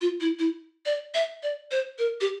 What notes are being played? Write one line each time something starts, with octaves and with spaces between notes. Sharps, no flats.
F4
E4
E4
D5
E5
D5
C5
A#4
G4